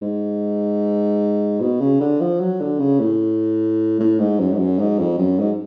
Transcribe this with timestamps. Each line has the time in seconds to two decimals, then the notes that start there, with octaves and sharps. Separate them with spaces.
0.02 G#2
1.61 B2
1.81 C#3
2.01 D3
2.21 F3
2.40 F#3
2.60 D3
2.80 C#3
3.00 A2
4.00 A2
4.19 G#2
4.40 F#2
4.53 G#2
4.59 F#2
4.79 G#2
5.00 F2
5.19 F#2
5.39 G#2